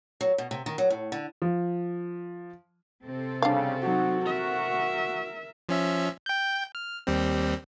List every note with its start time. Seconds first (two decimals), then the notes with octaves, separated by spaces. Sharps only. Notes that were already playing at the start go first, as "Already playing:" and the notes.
0.21 F#3
0.38 B2
0.51 C3
0.66 D#3
0.78 F#3
0.90 A2
1.12 D3
1.42 F3
3.05 C3 C4 A4
3.42 C#3 G3 D4 F5
3.82 F#3 D#4 F#4
4.21 A#4 E5
5.69 F3 C#4 E5
6.26 G5 G6
6.75 F6
7.07 D#2 G3 C4